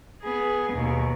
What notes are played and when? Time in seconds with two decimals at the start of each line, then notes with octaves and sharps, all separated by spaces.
0.23 B3 G#4
0.72 D#2 B2